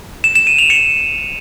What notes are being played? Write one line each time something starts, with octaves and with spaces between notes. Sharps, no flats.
E7
E7
D#7
F7
C#7